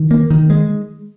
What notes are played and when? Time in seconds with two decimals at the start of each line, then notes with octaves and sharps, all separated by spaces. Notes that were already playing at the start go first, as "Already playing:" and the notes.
Already playing: D#3
0.11 A#3
0.30 D#3
0.50 G#3